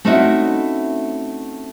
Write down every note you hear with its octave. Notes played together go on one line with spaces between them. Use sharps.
A3 C4 C#4 D#4 E4 F#4